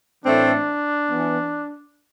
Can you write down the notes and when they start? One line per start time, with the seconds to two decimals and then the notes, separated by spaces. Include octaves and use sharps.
0.25 A2 E3 A3 C4 D4
1.07 E3 B3